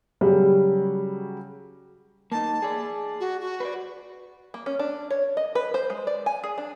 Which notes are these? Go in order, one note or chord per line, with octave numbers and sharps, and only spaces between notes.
C#3 F#3 G3 G4
A#3 D#4 A5
G#4 D5
F#4
F#4
B4 C5 D5
A#3
C#4
D4
C#5
D#5
B4
C5
G#3
D5
G#5
G#4
D4